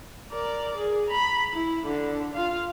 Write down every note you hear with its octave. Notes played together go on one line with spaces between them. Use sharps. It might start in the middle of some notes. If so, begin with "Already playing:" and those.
A#4 D5
G#4
A#5 B5
E4
D3 D4
F4 F5